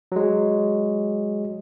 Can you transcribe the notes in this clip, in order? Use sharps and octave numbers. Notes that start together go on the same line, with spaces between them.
F#3 G#3